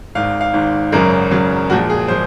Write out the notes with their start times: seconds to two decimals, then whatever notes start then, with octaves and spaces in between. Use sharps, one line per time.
0.15 G#1 G#2 D#3 F5
0.41 F5
0.53 G#1 G#2 D#3
0.92 G#1 F#2 C#3 F#3 A#4
1.31 G#1 F#2 C#3 F#3
1.70 A#1 A#2 F3 G#3 F#4
1.90 G#4
2.08 A#2 F3 G#3 C5